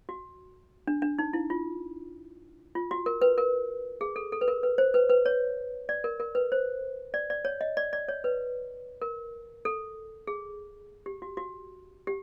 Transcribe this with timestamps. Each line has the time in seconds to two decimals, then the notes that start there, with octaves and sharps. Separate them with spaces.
0.09 F#4
0.87 D4
1.02 D4
1.19 D#4
1.33 E4
1.50 F4
2.75 F4
2.91 F#4
3.06 A#4
3.22 B4
3.38 A#4
4.01 G#4
4.16 A4
4.32 A4
4.41 B4
4.48 A#4
4.63 B4
4.78 C5
4.94 B4
5.10 B4
5.26 C#5
5.89 D5
6.04 A#4
6.20 A#4
6.35 B4
6.52 C5
7.14 D5
7.30 D5
7.45 C#5
7.61 D#5
7.77 D5
7.93 D5
8.08 C#5
8.24 B4
9.02 A#4
9.65 A4
10.27 G#4
11.06 G4
11.22 F#4
11.37 F#4
12.07 G4